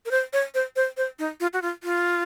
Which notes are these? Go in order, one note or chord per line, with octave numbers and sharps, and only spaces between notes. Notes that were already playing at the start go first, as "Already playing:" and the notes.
A#4
C5
C#5
C5
C5
C5
D#4
F4
F#4
F4
F4